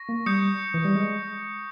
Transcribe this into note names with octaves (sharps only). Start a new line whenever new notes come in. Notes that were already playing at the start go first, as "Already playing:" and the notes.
Already playing: C#6 A#6
A#3
G3 D#6 G6 C#7
E3
G3
G#3